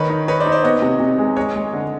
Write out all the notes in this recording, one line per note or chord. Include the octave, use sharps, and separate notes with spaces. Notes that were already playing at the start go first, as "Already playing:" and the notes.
Already playing: D#3 B4 C#5
D#4
D#4 B4 C#5
C5 D5
D#4
C5 D5
B3 C#5 D#5
C3
C3
G#3
G#3 C#5 D#5
G#3
D3